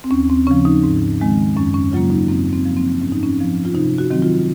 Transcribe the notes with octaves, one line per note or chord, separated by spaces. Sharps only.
C4
D#2 C#4
C4
C#3 F3 C#4
D#4
G#2
D#3 G#3 C4
F#2 C#4
C#4
C#3 F#3 A#3 F4
D#4
F#2 C4
C4
F3 A#3
C4
G#2 C#4
D#4
C#4
F3 C4
F4
C3 D#4
F#4
D#3 F#3 C4
F4